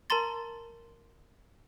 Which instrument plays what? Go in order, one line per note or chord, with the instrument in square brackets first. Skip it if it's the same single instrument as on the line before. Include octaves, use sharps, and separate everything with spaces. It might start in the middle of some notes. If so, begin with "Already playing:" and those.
[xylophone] A#4 A5 A#5 C6 A6